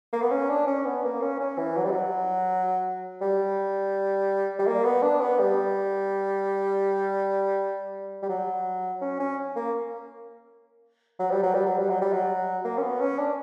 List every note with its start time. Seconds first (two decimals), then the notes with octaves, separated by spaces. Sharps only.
0.13 A#3
0.22 B3
0.31 C#4
0.49 D4
0.67 C#4
0.85 B3
1.03 A#3
1.22 C#4
1.40 C#4
1.58 E3
1.76 F#3
1.84 G3
1.91 F#3
3.21 G3
4.59 G3
4.67 A#3
4.84 B3
5.02 D4
5.21 B3
5.39 G3
8.23 G3
8.29 F#3
9.02 C#4
9.20 C#4
9.56 A#3
11.20 F#3
11.31 G3
11.43 F#3
11.54 G3
11.66 F#3
11.78 G3
11.90 F#3
12.01 G3
12.13 F#3
12.65 A#3
12.78 C#4
12.83 B3
13.01 C#4
13.19 D4